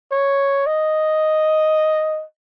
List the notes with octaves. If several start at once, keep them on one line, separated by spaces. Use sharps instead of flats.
C#5
D#5